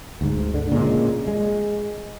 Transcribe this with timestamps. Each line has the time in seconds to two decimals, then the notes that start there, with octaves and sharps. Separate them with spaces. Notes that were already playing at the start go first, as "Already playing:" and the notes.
0.21 D2 G#2
0.54 D3
0.72 A#2 C#3 G3 G#3
1.28 G#3